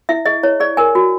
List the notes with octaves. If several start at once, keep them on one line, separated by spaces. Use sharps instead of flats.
E4 E5
G#4 D#5
E4 C#5
G#4 D5
A#4 G#5
F#4